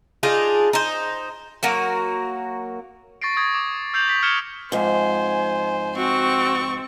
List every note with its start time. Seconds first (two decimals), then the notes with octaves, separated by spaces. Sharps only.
0.23 D4 D#4 F4 G#4
0.73 D#4 C5
1.63 F#3 A#3 F#4
3.22 C#6 A6 A#6 C7 D7
3.36 C#6 D#6 G#6 A#6
3.54 D6
3.94 E6 G6 C7 F7 F#7
4.09 B6
4.23 F6 G#6 C#7 E7 G7
4.72 F2 G#2 C5 G#5
5.96 C4 F#4 C#6